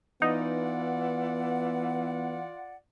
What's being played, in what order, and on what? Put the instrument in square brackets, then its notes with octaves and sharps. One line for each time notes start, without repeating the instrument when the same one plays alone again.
[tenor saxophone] E3 [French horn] B3 [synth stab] D#4 [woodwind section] F4 D5 F#5